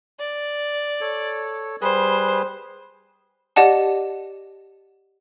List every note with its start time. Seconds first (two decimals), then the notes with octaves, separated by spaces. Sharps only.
0.19 D5
1.01 A4 C#5
1.81 G3 G#4 B4 C5
3.56 G4 D5 D#5 F#5 A5